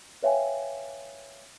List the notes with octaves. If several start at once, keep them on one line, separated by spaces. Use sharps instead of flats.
B4 C#5 E5 F5 G5 G#5